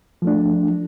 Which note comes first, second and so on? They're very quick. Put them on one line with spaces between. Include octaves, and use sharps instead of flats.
F3 A3 D4